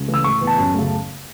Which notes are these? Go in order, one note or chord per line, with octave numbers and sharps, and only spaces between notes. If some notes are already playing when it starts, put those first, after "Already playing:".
Already playing: C#2
C#3 E3 A3
E6
A2 C#6
E3 B3
A5
F#2 A5
C#3 A3